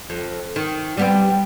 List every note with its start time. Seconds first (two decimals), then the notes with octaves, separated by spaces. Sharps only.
0.10 F2
0.56 D#3
0.97 G3 B3 C4